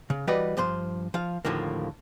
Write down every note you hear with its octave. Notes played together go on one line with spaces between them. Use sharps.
C#3
E3 G3 F#4 B4 D5 D#5
G2 F3 C5 C6
F3 F5
D#2 A2 D3 F3 A#3